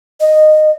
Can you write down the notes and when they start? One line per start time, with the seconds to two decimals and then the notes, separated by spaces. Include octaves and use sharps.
0.20 D#5